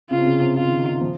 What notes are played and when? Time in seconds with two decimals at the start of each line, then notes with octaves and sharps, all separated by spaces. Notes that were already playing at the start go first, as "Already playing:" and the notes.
0.10 C#3 F4
0.18 C3
0.26 C#3
0.41 C3
0.55 C#3 F4
0.67 D#3
0.79 D#3
0.89 D#3
1.01 F3